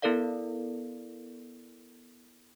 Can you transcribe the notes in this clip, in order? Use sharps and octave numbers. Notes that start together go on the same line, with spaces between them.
B3 E4 A4 A#4 D5 F5